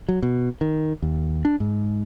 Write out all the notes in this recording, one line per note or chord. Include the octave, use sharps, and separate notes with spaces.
F#3
B2
D#3
D#2
D4
G#2